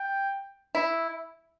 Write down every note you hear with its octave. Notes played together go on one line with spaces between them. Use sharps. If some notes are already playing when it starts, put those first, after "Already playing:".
Already playing: G5
E4